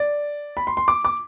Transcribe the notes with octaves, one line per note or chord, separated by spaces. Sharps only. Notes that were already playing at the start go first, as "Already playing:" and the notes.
Already playing: D5
B5
C6
C6
D6
D6